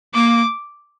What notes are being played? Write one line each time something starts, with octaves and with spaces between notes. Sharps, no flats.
A#3 D6